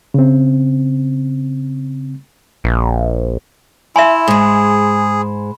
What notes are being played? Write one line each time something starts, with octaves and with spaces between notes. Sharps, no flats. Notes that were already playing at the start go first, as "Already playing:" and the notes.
C#3 C4
A#1
E4 E5 G#5 B5 C6 E7
G#2 G#3 G#4